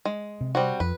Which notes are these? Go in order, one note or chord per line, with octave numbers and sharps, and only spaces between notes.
G#3
C3
G3 C4 F#4
F2 B4